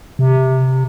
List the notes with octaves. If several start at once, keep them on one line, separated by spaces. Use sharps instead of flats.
C3